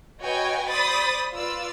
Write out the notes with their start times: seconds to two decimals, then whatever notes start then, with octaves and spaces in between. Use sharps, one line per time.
0.22 F#4 B4 C#5 D#5 G5 G#5
0.68 C5 D5 B5 D#6 A6
1.33 F4 B4 D5 E6